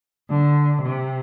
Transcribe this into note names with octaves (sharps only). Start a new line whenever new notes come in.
D3
C3